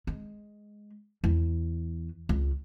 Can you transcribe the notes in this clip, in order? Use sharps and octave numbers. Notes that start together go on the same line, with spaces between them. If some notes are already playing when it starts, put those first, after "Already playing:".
G#3
E2
C#2